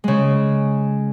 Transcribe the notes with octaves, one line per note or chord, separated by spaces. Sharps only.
C#3 G#3